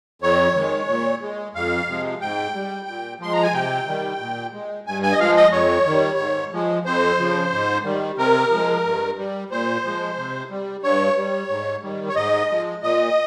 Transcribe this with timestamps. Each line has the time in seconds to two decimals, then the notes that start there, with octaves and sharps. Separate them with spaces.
0.22 F2 C#5
0.55 D#3 G#3
0.88 A#2
1.22 G#3
1.55 F2 F5
1.89 C3 F3 G#3
2.21 G#2 G5
2.55 G3
2.88 A#2
3.20 F3 G#3 C6
3.33 A#5
3.43 G#5
3.53 C3 G5
3.87 D#3 G3
4.21 A#2
4.53 G#3
4.87 G2 G#5
5.03 G#5
5.13 D#5
5.19 F3 G#3 F5
5.36 D#5
5.52 F2 C#5
5.86 D#3 G3
6.19 G#2
6.53 F3 G#3
6.85 F2 C5
7.19 C#3 F3
7.52 G#2
7.84 D#3 G3
8.18 C3 A#4
8.51 F3 G#3
8.85 G2
9.18 G3
9.51 A#2 C5
9.84 F3 G#3
10.17 C3
10.50 G3
10.83 G2 C#5
11.17 G3
11.50 G#2
11.83 D#3 G3
12.09 C#5
12.16 G#2 D#5
12.49 F3 G#3
12.83 A#2 D#5